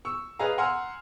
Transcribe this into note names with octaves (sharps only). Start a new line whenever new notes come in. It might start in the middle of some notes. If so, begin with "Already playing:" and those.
C#6 E6
G#4 B4 C#5 D#5 F5 A#5
F#5 G#5 A#5 C6 E6 F6